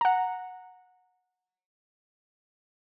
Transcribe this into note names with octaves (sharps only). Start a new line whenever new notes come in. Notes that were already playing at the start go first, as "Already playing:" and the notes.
F#5 A#5